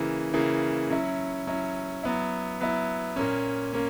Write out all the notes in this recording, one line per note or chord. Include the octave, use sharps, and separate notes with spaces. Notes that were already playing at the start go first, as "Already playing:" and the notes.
Already playing: C#3 E3 A#3
C#3 E3 A#3
F#3 C#4 E4
F#3 C#4 E4
F#3 B3 E4
F#3 B3 E4
A#2 A#3 C#4
A#3 C#4